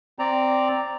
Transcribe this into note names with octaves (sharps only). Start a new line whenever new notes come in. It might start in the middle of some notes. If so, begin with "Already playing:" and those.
C4 D5 A#5